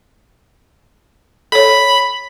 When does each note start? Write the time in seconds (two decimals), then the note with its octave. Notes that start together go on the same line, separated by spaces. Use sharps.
1.52 A4 C#5 B5